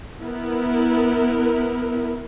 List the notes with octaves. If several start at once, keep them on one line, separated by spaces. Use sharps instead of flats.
B3 E4 A#4